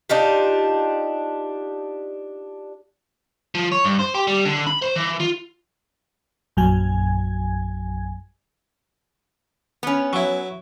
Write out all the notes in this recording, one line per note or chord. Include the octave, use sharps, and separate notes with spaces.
D4 D#4 F4 G4
F3
C#5
G2
C5
G4
G3
D3
B5
C5
E3
F4
A#1 F#2 F#3 G#5 G#6
B3 C#4
F#3 E4